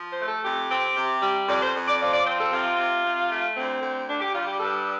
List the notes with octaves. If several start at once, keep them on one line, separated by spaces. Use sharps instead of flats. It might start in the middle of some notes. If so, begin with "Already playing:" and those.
Already playing: F3
C5
A3
A4
F2 G4
C4
C3
G3
F2 D5
C5
F2
D5
F3 D5
D5
C4 C5
A4
C3 F4
C3
C3
A3
D2 C4
D2
D3 D4
G4
G3 F4
G4
G2 A4